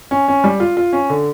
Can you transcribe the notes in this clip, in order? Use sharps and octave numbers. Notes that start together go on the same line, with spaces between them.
C#4
C#4
G3
F4
F4
C#4
D3